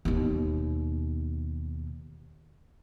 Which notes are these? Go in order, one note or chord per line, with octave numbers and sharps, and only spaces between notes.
D#2 B2